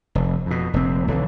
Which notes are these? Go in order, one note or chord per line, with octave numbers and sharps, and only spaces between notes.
F1
F2 B2
F1 A#2 C4
B1 D3 E3